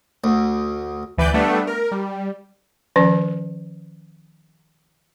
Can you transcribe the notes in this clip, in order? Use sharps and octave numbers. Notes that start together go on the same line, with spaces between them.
D2
D2 E3 B4 D5 G6
G3 A3 B3 D4
A#4
G3
D#3 F3 C#4 D5